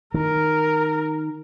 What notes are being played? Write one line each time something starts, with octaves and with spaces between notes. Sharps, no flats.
D#3 A#4